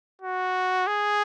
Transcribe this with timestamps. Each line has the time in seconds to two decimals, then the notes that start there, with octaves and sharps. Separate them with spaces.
0.21 F#4
0.87 G#4